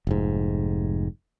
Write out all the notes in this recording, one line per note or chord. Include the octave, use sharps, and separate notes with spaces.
F1 G#2